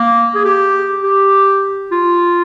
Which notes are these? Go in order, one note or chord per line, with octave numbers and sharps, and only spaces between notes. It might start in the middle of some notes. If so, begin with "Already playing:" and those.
Already playing: A#3
G#4
G4
G4
F4